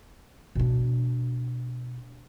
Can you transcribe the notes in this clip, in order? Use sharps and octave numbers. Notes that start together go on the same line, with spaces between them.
B2 D4